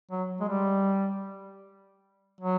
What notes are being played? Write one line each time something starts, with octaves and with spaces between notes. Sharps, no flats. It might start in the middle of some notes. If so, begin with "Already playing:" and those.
F#3
G#3
G3
F#3